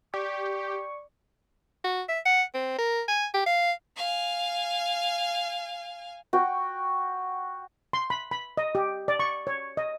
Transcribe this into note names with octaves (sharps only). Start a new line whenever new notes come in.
G4 D5 C#6
F#4
E5
F#5
C4
A#4
G#5
G4
F5
F5 G#5
F#4 G5
C6
B5
B5
D#5
G4
D5
C#6
C#5
D#5